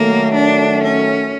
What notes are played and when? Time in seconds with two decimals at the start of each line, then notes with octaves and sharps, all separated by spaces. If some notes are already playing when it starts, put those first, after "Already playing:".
Already playing: D#3 F#3 A3 A#3
0.34 D4
0.83 C#4